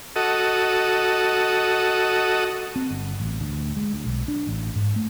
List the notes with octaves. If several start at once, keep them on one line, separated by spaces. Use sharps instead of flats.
F#4 A4 D#5
C4
G1
A1
D2
G#3
D2
B1
D4
A1
G#2
A3